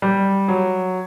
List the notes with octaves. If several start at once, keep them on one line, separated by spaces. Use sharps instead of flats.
G3
F#3